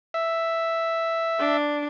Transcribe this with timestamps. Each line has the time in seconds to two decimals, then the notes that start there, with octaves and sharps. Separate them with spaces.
0.14 E5
1.40 D4